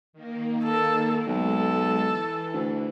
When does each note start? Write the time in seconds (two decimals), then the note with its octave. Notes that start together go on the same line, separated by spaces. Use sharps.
0.13 D#3 A#3
0.65 A4
1.27 B1 G#3 A4
2.04 E3
2.54 D2